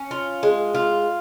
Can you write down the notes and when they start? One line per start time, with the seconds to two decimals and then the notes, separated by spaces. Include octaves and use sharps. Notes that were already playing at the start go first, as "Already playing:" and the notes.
Already playing: C#4
0.11 F4
0.43 G#3
0.75 F4